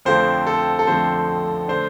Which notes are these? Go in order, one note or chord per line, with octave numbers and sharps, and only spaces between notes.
F2 D3 F3 A3 C4 C5
A4
A4
F2 D3 F3 A3 C4 C5
D3 A3 D4 C5